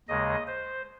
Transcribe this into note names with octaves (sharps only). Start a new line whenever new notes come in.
D#2 C#3 G#3 D#5
C5